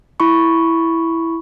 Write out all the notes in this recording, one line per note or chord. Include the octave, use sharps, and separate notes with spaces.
E4 B5 C#6